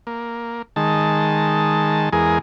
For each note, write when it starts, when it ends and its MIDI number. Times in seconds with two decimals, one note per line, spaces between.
0.07 0.62 58
0.76 2.09 51
0.76 2.09 56
0.76 2.09 81
2.12 2.39 40
2.12 2.39 56
2.12 2.39 68
2.12 2.39 70